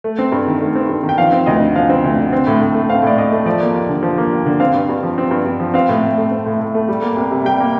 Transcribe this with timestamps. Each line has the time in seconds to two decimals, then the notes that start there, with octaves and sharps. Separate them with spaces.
0.04 A3
0.19 C4
0.32 G2
0.47 D#3
0.61 A3
0.75 C4
0.89 G2
1.03 D#3
1.09 G5
1.18 F3 F5
1.32 C4
1.46 D2 D#5
1.61 D3
1.76 F3 F5
1.90 C4
2.04 D2
2.18 D3
2.32 C4
2.47 A2
2.61 A2
2.74 A3
2.89 C4 F5
3.03 A2 D5
3.17 A2 D#5
3.32 A3
3.46 F3 D5
3.60 A#3
3.74 D#2
3.89 D3
4.03 F3
4.18 A#3
4.32 D#2
4.46 D3
4.60 C4 F5
4.74 G2
4.89 G2
5.03 F3
5.18 C4
5.31 G2
5.45 G2
5.60 F3
5.74 C4 F5
5.89 A2
6.02 A2
6.18 A3
6.31 C4
6.46 A2
6.60 A2
6.75 A3
6.89 G3
7.02 A#3
7.17 C2
7.31 C3
7.45 G3 G5
7.60 A#3